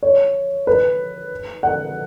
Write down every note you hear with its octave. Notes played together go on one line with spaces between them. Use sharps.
C#5
B4
F#5